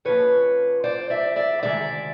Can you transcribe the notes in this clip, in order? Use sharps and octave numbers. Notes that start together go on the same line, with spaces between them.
F2 C#3 F3 A#3 B4 C#5
C5 D5
D5 E5
D5 E5
D2 C3 D#3 G#3 D5 E5